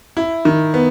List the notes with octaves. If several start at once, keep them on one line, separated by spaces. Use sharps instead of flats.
E4
D#3
B3